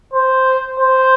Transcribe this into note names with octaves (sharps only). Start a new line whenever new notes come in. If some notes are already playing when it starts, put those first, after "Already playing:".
C5
C5